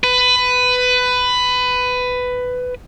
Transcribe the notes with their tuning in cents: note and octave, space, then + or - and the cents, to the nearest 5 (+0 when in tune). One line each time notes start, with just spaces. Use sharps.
B4 +15